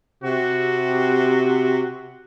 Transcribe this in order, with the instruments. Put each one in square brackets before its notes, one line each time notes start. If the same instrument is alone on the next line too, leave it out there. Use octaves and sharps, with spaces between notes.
[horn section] C3 F#4